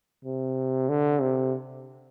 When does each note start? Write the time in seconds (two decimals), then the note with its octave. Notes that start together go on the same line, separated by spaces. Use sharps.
0.25 C3
0.89 D3
1.21 C3